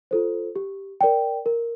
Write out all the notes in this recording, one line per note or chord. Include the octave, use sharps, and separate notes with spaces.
F4 A4 C5
G4
A#4 D5 G5
A#4